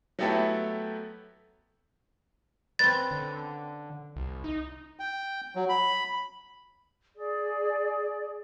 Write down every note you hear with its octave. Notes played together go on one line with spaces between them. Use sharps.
F#3 A3 B3 E4 G4 A4
C4 C#4 B4 A6
D3
C2
D#4
G5
F#3
B5
G#4 D5